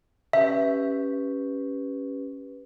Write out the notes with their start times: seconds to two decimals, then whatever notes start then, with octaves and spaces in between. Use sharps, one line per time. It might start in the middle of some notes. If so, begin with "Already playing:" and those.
0.33 C#4 G4 B4 E5